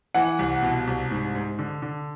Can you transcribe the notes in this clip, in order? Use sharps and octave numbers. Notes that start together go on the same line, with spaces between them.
E3 F#5
C2
B2
C2
G#2
G#2
D3
D3